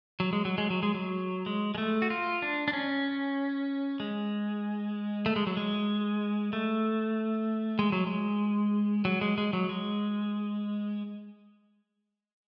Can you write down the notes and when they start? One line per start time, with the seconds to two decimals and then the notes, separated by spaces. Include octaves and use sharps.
0.20 F#3
0.33 G#3
0.45 F#3
0.58 G#3
0.70 F#3
0.83 G#3
0.94 F#3
1.46 G#3
1.75 G#3
1.78 A3
2.02 F#4
2.10 F4
2.42 D4
2.68 D4
2.73 C#4
4.00 G#3
5.26 A3
5.36 G#3
5.47 F#3
5.57 G#3
6.53 A3
7.79 G#3
7.92 F#3
8.07 G#3
9.05 F#3
9.21 G#3
9.38 G#3
9.53 F#3
9.69 G#3